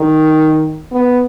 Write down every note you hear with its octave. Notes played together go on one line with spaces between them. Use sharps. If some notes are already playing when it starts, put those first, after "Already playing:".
Already playing: D#3
B3